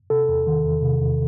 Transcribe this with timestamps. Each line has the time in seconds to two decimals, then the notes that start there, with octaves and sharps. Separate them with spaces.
0.10 C3 A4
0.29 E2
0.47 D#3
0.65 E2
0.83 C3
1.01 E2